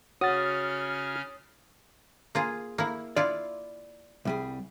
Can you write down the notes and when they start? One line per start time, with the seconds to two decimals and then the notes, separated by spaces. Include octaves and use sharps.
0.21 C#3 C#4 F#4 C#5 D#6 F6 A6
2.35 A#3 F4 G#4
2.78 A#3 E4
3.16 E4 F4 D5
4.25 C2 G3 G#4